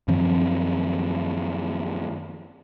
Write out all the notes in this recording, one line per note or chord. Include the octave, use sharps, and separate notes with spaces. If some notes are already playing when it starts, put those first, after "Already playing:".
F#2 D#3 F3 C4